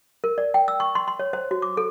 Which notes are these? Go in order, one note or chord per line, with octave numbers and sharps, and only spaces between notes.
A#4
D5
G5
E6
C#6
C6
C6
C#5
C5
F#4
D6
A4